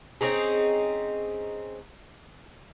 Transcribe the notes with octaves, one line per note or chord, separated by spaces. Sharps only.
C4 C#4 D#4 G#4